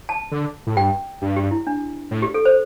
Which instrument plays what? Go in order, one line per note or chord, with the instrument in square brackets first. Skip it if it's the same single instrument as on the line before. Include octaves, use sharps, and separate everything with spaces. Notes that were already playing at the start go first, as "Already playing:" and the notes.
[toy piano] A5
[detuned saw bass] D3
A2
[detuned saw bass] G2 [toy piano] G5
[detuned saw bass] G2
[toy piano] G4
E4
D4
[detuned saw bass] A2
[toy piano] G4
A4
C5